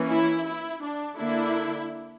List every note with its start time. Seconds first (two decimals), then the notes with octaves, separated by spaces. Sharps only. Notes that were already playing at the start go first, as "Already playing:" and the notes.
Already playing: E3 A#3 C#4
0.12 E4
0.47 E4
0.83 D4
1.19 D3 A#3 D4 E4